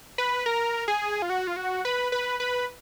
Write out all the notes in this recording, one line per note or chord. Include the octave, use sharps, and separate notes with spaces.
B4
A#4
G#4
F4
F#4
F4
F#4
B4
B4
B4